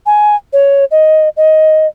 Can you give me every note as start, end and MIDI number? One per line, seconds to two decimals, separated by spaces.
0.06 0.36 80
0.53 0.85 73
0.91 1.29 75
1.37 1.87 75